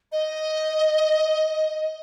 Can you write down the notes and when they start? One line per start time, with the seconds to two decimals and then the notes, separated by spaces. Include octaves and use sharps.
0.12 D#5